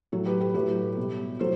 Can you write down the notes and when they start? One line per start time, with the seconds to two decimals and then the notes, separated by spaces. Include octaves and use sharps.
0.12 A2 F#3 A4
0.26 G4 B4
0.40 G4 B4
0.54 A2 F#3 G4 B4
0.97 B2
1.02 G3
1.39 A2 F#3 A4 C5